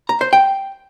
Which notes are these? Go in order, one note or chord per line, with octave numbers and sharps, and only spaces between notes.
A#5
C5
G5